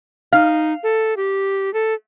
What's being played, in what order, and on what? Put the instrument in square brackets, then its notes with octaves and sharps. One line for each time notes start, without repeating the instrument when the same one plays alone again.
[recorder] D#4 [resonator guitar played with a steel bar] F5
[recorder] A4
G4
A4